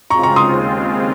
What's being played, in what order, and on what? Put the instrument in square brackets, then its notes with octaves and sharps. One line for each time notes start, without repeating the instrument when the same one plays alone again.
[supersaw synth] C#3 G#3 C4 F4 [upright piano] A#5 C#6
[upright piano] A#5 C#6
C6 D#6
[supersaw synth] D#2 C#3 G#3 C4 F4